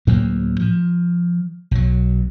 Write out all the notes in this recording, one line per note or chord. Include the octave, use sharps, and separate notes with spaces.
D2 A2 F#3 A#3
F3
B1 F#3